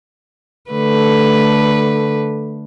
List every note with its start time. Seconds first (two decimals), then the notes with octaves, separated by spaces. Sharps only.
0.71 D3 A3 B4